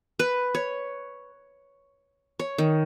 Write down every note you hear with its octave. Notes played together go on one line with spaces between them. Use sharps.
B4
C#5
C#5
D#3